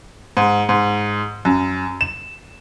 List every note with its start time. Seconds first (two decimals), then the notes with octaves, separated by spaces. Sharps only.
0.37 G#2
0.69 G#2
1.45 F#2
2.01 E7